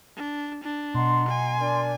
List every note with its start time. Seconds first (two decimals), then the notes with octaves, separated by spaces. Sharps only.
0.16 D4
0.64 D4
0.94 B2 D#5 F#5 A#5 C6
1.28 G#5
1.59 D4 A#4 D5